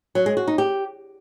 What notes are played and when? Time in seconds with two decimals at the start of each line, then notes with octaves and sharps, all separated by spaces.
0.15 F#3
0.26 G#3
0.37 F#4
0.47 D#4
0.58 G4